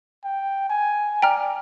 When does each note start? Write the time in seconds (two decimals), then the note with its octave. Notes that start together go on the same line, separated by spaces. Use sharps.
0.24 G5
0.70 G#5
1.22 D5 G5 A#5 F6